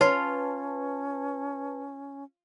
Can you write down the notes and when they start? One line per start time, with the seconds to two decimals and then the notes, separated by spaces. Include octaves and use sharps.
0.01 C#4 F4 B4 C#5 A5